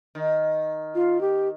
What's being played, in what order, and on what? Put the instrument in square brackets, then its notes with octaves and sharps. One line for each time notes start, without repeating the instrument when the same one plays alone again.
[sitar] D#3
[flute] F4
G4